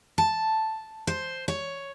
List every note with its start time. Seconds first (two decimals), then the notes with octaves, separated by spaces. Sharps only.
0.18 A5
1.07 C5
1.48 C#5